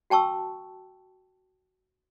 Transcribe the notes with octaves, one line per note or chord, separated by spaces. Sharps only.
F#4 G5 A5 C#6 E6